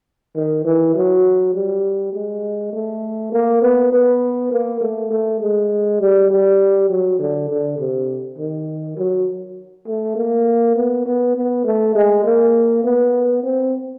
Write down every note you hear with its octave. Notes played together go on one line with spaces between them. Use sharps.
D#3
E3
F#3
G3
G#3
A3
A#3
B3
B3
A#3
A3
A3
G#3
G3
G3
F#3
D3
D3
C3
D#3
F#3
A3
A#3
B3
B3
B3
A3
G#3
A#3
B3
C4